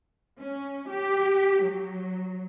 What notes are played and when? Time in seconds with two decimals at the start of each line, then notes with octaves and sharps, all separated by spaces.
0.40 C#4
0.89 G4
1.64 F#3